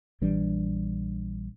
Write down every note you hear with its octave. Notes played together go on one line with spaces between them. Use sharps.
A#1 E3 G3 D4